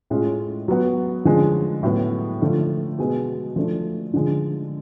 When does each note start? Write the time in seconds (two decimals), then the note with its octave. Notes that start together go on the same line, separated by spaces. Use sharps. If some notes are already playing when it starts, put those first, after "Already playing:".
0.10 A2 G#3 C#4 F4
0.68 F#3 B3 F#4
1.25 D3 F3 G#3 C#4
1.83 A2 F#3 B3
2.41 D3 F3 A3 F4
2.98 B2 G#3 B3
3.56 F3 A3 D4
4.14 D3 F3 G#3